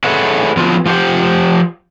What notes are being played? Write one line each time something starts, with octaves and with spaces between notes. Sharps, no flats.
G#4 A4 B4 C#5 E5 F#5
F3 F#3 B3 F4
F3 F4 G4 C5 F#5